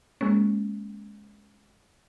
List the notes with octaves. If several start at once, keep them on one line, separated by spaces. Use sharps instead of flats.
G#3 A#3 C#4